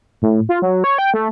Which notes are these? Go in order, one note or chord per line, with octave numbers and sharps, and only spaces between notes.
A2
F4
F#3
C#5
G5
A3